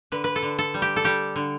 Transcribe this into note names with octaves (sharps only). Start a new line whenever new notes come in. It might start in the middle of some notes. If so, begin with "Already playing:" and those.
D3 B4
B4
A4
D3
A4
G3
G4
A4
G3 G4
D3